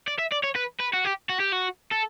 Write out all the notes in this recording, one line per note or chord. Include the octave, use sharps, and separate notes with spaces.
D5
E5
D5
C#5
B4
B4
F#4
G4
F#4
G4
F#4
A4